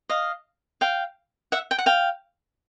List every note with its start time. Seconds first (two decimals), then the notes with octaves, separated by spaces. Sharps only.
0.09 D#5 F5
0.81 F5 G5
1.52 E5 F#5
1.71 G5
1.78 F#5
1.86 F5 G5